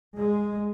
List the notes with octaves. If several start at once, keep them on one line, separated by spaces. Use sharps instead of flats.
G#3